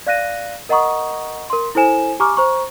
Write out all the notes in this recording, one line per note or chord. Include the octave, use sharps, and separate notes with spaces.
D5 F5 F#6 A#6 D#7
A#4 D#5 F#5 A#5 C#6 D#6
A#4 C6
E4 A4 C5 G#5 E7
G4 G#5 A#5 C#6 D6 F6
C5 A#5 C#6